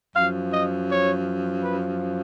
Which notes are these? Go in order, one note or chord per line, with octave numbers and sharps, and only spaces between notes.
F#2 F3 F5
D#5
C#5
B4